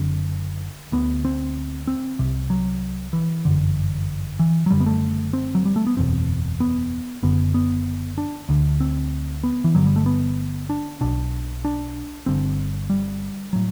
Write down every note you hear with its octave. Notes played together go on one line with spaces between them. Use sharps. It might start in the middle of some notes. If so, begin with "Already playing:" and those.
Already playing: F#1 F#2 D3 C4
D2 D3 B3
C4
C4
C2 C3
F#3
E3
G1 F#2 D3
E3
F#3
F#1 F#2 D3 G3
B3
A3
C4
F#3
G3
A3
B3
F#1 E2 B2 C4
B3
F#1 F#2 D3 B3
B3
D4
D2 D3
C4
B3
E3
G1 G2 D3 F#3
G3
A3
B3
D4
B1 B2 D4
D4
G1 G2 D3 C4
G3
A2 F#3